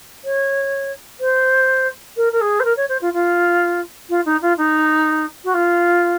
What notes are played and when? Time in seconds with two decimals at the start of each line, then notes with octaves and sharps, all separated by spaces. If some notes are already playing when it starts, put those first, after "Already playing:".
0.24 C#5
1.20 C5
2.17 A#4
2.32 A#4
2.41 G#4
2.60 C5
2.64 A#4
2.77 C#5
2.89 C5
3.01 F4
3.13 F4
4.09 F4
4.25 D#4
4.42 F4
4.58 D#4
5.44 F#4
5.54 F4